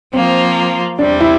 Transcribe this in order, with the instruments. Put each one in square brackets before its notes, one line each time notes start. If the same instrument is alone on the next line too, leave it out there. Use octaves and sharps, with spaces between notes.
[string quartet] F3 A#3 F4 [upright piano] C4
[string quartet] E2 C3 G3 C4 [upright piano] D4
[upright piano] E4